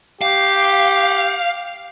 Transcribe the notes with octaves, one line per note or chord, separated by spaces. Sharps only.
G4 F5